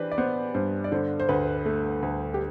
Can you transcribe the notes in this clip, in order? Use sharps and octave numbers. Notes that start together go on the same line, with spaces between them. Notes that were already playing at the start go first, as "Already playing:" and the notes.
Already playing: E3 D4 G4 B4 C5
D5
B3 C5
G2 C5
D5
D3 C5
C5
D2 B4
A3
D2
G4